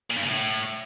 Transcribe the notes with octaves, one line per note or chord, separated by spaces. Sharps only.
A#2
G2
C#3
A2